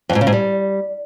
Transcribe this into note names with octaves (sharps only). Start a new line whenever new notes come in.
F2
G#2
C#3
G#2
G3